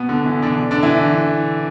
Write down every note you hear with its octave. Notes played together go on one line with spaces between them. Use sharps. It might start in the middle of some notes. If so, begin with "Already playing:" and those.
Already playing: B2 B3
D3
E3
D3 D4
D3 D4
E3 E4